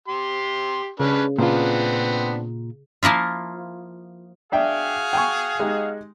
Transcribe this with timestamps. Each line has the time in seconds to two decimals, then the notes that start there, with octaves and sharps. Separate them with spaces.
0.08 G4 C6
1.00 C#3 C#4 D4 B4
1.39 A#2 C#3 B3 C4 D4 F4
3.03 F3 A#3 E4 F4
4.52 D4 F#4 G#4 E5 F5 G5
5.13 G5 G#5 C#6
5.60 G#3 D#4 G4